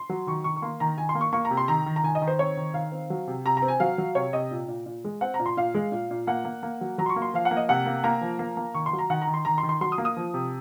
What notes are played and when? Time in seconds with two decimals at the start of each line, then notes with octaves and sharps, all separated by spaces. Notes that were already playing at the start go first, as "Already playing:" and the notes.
Already playing: C6
0.09 F#3
0.27 D#3 C#6
0.44 D#3 C#6
0.56 C#6
0.62 A#3 C6
0.80 D#3 A#5
0.98 D#3 G#5
1.09 C6
1.15 A#3
1.21 C#6
1.33 A#3 C#6
1.45 A#5
1.50 C3
1.57 C6
1.68 D#3 A#5
1.86 D#3
1.96 A#5
2.04 D#3 G#5
2.15 D#5
2.22 D#3
2.27 C5
2.39 C4 C#5
2.57 D#3
2.74 D#3 F5
2.92 C4
3.10 F#3
3.27 C3
3.45 C3 A#5
3.57 A#5
3.62 C4
3.68 G#5
3.80 F#3 F5
3.98 F#3
4.15 C3 C#5
4.33 C3 D#5
4.51 A#2
4.68 A#2
4.86 A#2
5.05 G#3
5.21 C4 F#5
5.34 A#5
5.39 A#2
5.46 C6
5.57 A#2 F5
5.75 G#3
5.92 A#2
6.11 A#2
6.27 A#3 F#5
6.45 A#3
6.63 A#3
6.81 F#3
6.98 F#3 A#5
7.06 C6
7.09 C#6
7.16 A#3
7.22 C6
7.34 F3 F5
7.45 F#5
7.51 A#3
7.57 D#5
7.69 C3 F#5
7.86 A#3
8.04 A#3 A#5
8.21 F3
8.39 A#3
8.57 A#3
8.74 D#3 C#6
8.86 C6
8.93 F#3
8.99 A#5
9.10 D#3 F#5
9.22 A#5
9.27 D#3
9.34 C6
9.45 D#3 A#5
9.58 C6
9.63 D#3
9.69 C6
9.81 F#3 C6
9.92 D#6
9.98 A#3
10.05 D#6
10.17 F3
10.34 C3